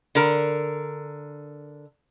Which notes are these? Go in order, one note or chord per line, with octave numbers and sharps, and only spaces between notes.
D3 A#4